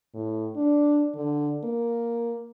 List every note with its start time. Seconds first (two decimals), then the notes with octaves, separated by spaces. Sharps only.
0.15 A2
0.56 D4
1.15 D3
1.64 A#3